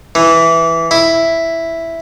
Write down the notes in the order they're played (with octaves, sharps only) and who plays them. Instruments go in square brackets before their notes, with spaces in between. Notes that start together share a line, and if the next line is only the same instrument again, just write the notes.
[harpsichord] E3
E4